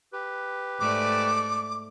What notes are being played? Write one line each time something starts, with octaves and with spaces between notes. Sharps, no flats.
G4 B4
G#2 A3 D5 D6